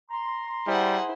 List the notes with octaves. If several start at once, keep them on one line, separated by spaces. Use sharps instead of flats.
A#5 C6
G3 E4 G#4 C5 F#5